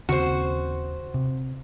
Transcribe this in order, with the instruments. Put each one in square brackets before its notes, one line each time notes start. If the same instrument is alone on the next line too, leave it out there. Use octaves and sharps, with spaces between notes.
[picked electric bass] D#2 C#3 C4 [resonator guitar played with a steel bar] F#4 C5
[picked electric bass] C3